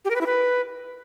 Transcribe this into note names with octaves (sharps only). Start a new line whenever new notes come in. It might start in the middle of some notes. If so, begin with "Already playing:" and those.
G4
A#4
B4
E4
B4